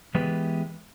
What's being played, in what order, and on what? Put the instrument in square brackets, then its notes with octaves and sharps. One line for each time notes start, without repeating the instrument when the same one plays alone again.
[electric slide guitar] E3 G#3 B3 G4 B4